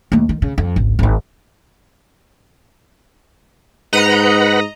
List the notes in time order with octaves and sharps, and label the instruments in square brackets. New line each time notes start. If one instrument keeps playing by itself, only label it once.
[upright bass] D#2 A3
D#3
C#3
F2
G#1 C#2
G#1 D#4
[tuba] G#2 [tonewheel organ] B4 F#5 B5 [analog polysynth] D#5 A#5